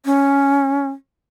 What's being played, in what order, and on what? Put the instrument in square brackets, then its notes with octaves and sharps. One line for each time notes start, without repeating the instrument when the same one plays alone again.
[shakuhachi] C#4